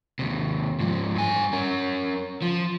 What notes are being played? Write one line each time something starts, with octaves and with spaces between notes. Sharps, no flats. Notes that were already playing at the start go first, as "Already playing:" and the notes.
D#2 C3
G#2 F3
G2 G#5
C#4 A#4
F3